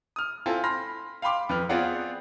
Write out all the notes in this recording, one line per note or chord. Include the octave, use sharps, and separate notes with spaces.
D#6 F6
C4 E4 F4 A4 G#5
B5 C6 F6 A#6
F5 G5 B5 C6 D6
F2 B4 F6
B3 C4 F4 G#4 D5 F#5